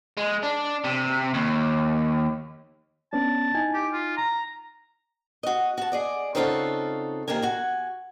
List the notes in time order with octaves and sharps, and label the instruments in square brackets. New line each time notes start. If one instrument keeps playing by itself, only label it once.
[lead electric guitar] G#3
D4
C3
D#2
[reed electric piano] B3 C#4 D4 [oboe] A5
[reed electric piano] D#4 E4 G#5
[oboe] G4
F4
A#5
[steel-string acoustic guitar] F#4 D#5
F#4 A5
G#4 D5 D#5
C#3 C4 D#4 F4 F#4 A4
C3 D#3 A#3 A#4 G#5
F#4 G#5